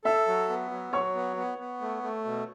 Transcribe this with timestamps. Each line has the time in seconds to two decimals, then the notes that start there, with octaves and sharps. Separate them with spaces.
0.04 A4 E5 E6
0.27 F#3
0.49 B3
0.71 F#3
0.93 F#3 C#5 C#6
1.15 B3
1.37 B3
1.58 B3
1.81 A3
2.03 A3
2.24 B2